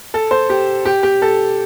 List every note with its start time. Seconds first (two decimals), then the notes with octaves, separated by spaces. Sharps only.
0.14 A4
0.31 C5
0.50 G4
0.85 G4
1.03 G4
1.22 A4